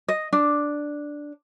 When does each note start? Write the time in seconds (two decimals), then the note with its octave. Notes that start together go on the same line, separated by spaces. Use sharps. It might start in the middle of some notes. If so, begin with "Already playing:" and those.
0.08 D#5
0.33 D4